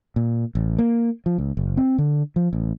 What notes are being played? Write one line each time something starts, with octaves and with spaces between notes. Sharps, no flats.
A#2
A1
A#3
F3
C#2
F#1
C4
D3
F3
A1